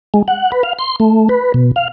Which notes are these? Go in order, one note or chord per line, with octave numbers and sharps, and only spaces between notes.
G#3
F#5
B4
F5
C6
A3
B4
B2
F5